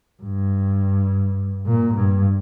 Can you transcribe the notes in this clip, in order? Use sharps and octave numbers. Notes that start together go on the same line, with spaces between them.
G2
A#2
G2